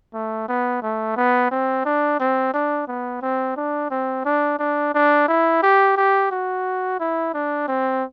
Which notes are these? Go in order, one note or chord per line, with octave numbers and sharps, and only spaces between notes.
A3
B3
A3
B3
C4
D4
C4
D4
B3
C4
D4
C4
D4
D4
D4
E4
G4
G4
F#4
E4
D4
C4